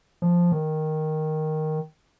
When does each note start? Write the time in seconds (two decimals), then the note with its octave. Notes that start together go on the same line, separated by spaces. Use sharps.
0.22 F3
0.52 D#3